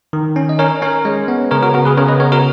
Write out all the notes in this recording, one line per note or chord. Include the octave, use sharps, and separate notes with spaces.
D#3
C#4
D#5
C#4 A#4 C#5
C#4 A#4 C#5
G#3
B3
C#3 A#4 C#5
F#4 A#4
B3 F#4 A#4
G#4 B4
C#3 A#4 C#5
B4 D#5
B3 A#4 C#5
F#4 A#4